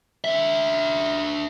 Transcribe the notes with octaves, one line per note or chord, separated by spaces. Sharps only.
D4 E5